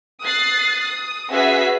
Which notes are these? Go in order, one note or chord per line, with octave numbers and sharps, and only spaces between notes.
D#6 F#6 A6 C7
D#6
C#4 F#4 G#4 B4 E5 B6